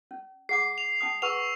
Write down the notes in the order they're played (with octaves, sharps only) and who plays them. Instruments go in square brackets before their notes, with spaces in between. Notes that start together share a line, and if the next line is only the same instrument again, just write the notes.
[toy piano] C#4
[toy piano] G#4 F#5 D6 [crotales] C7
[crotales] F7
[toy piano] C#4 A5 D#6
[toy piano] G#4 B4 F#5 [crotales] C#6 E6 F7